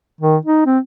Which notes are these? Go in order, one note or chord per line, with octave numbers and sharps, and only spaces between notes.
D#3
D#4
C4